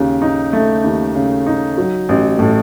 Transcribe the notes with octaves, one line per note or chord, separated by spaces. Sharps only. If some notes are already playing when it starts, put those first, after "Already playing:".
Already playing: D#2 C#3
D#4
A3
D#2
C#3
D#4
F#3
A1
A2